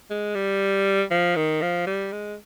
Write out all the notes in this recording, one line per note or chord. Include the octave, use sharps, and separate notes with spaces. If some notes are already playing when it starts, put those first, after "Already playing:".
G#3
G3
F3
D#3
F3
G3
G#3